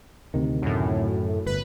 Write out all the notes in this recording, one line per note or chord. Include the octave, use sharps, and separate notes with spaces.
D2 C3 D#3
F#2 A2
G1 B4